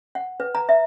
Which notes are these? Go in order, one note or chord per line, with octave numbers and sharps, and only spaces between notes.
F#5
B4
A#5
E5